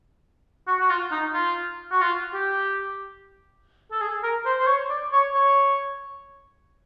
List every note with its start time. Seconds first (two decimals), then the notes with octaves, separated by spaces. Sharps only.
0.67 F#4
0.80 F#4
0.90 F4
1.11 D#4
1.34 F4
1.92 F#4
2.01 F4
2.34 G4
3.91 A4
4.01 G#4
4.23 A#4
4.46 C5
4.59 C5
4.67 C#5
4.90 D5
5.13 C#5
5.35 C#5